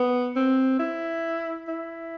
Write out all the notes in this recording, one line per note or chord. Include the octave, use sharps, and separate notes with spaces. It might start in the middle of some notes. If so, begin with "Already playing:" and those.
Already playing: B3
C4
E4
E4